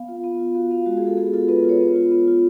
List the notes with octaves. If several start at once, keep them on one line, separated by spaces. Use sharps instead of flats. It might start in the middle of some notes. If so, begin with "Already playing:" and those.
Already playing: B3 F5
F4
B3
F4
F#4 F5
B3 F5
G#3 F#4
G#4
G#3 A4
B3 G#4
F4 A4
B3 B4
A4
F4 C#5
B3
F4
B3
F4